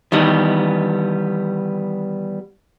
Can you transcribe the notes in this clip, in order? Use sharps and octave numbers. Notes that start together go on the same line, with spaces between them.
D#3 E3 G3 B3